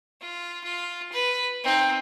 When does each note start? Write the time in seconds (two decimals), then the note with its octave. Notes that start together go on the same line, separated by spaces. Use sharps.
0.21 F4
0.64 F4
1.12 B4
1.64 C4 D#4